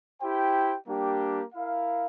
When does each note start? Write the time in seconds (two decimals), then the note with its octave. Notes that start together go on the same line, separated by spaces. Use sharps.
0.20 E4 G4 C5 G5
0.87 G3 A#3 D4 G4
1.54 E4 A#4 F5